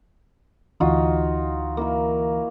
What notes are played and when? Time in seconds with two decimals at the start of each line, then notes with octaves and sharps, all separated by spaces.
0.80 D2 E3 D#4 F4 F#4
1.77 A#3 E4 A#4